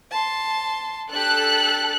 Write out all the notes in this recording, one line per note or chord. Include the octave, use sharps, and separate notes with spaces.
A5 C6
D4 G4 A4 F#6